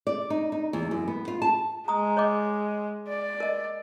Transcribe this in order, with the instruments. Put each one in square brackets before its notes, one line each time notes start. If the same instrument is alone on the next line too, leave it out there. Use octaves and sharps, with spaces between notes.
[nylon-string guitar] D5
D#4
D#4
E2
F#2
B3
F4
A5
[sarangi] G#3 [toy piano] A#5 D#6
[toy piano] C#5 D#5 D6
[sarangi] D5
[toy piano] A#4 D#5